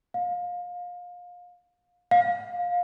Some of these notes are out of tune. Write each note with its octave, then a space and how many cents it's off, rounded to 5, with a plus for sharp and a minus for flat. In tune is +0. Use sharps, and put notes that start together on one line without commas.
F5 +25
F5 +20